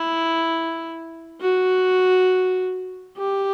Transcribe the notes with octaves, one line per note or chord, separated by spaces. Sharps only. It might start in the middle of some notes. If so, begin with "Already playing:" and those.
Already playing: E4
F#4
G4